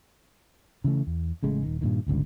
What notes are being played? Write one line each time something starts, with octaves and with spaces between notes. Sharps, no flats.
C#3 E3 A3
E2
A1 C#3 G#3 A3
D#1 D#3
G2 A#2 D3 D#3
D1 G1 C#2 D3